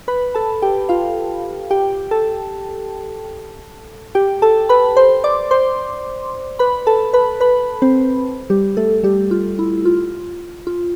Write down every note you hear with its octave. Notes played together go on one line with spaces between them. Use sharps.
B4 B5
A4 A5
G4 G5
F4 F5
G4 G5
A4 A5
G4 G5
A4 A5
B4 B5
C5 C6
D5 D6
C5 C6
B4 B5
A4 A5
B4 B5
B4 B5
C4 C5
G3 G4
A3 A4
G3 G4
F4
E4
F4
F4